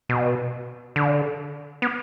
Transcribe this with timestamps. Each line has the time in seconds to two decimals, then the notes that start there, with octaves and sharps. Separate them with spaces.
0.09 B2
0.96 D3
1.82 B3